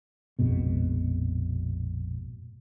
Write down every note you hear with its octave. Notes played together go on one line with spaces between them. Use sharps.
A#1 F2 G#2 B2